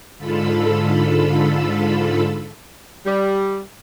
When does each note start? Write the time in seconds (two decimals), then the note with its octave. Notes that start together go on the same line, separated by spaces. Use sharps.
0.18 G#2 D3 F4 A4 B5 E6
3.05 G3